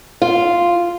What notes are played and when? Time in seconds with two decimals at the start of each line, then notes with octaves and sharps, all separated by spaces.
0.22 F4